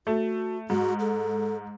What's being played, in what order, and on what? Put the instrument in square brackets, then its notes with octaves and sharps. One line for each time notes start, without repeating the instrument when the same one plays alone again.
[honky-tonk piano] A3 [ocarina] F#4
[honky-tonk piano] G#2 [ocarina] F#4
[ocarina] A4